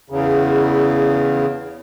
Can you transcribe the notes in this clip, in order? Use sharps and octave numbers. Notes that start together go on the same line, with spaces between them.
E2 C#3